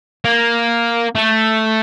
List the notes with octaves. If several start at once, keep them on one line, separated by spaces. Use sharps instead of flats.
A#3
A3